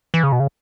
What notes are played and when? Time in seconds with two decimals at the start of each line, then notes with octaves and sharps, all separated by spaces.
0.14 E3
0.23 C#3
0.32 B2
0.40 C#3